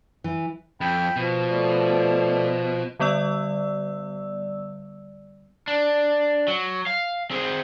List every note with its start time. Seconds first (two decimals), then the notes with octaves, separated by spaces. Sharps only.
0.24 E3
0.81 F2 G5 B5
1.16 B2 F3
1.49 A3 D5
2.99 D3 G3 B3 D5 E6
5.68 D4
6.48 F#3
6.86 F5
7.31 C4 G#4